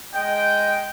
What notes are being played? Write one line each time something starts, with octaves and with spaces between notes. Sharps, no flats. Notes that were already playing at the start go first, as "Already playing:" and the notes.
G#3 D#5 G5